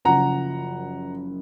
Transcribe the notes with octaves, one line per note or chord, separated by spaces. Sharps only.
F#1 F#2 F3 F#5 A#5